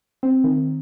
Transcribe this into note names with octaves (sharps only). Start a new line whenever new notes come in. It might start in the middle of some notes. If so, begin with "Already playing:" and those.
C4
D#3